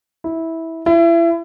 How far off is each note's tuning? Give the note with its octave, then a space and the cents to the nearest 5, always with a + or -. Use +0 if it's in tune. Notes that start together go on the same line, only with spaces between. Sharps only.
E4 -15
E4 +30